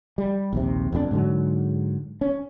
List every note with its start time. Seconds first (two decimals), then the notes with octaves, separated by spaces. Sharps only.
0.18 G3
0.53 A#1 D#2 C3
0.92 F1 F2 B2 D4
1.11 G#2 D3 F#3
2.21 C#4